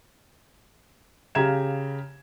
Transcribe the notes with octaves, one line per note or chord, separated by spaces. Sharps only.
C#3 G4 F5 A#5 G#6 E7